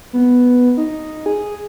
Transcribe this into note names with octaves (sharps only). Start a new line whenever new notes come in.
B3
D#4
G#4